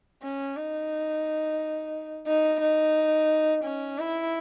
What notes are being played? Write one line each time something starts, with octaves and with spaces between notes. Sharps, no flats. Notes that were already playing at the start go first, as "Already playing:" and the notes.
C#4
D#4
D#4
D#4
C#4
E4